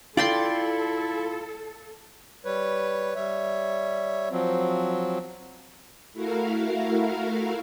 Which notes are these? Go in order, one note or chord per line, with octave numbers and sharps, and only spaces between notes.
E4 F4 A4 D5 G5 C6
G3 B4 C#5
G3 C#5 E5
F3 F#3 C4
A3 E4 F#4 A#4 F5